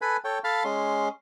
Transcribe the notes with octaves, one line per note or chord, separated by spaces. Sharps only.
A4 B4 G#5 B5
A4 C#5 G5
A4 F5 A5 B5 F6
G#3 C#4 C6